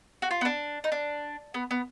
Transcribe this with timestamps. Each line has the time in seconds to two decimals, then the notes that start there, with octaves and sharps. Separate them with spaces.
0.22 F#4
0.31 F4
0.41 B3
0.45 D4
0.84 D#4
0.92 D4
1.54 B3
1.71 B3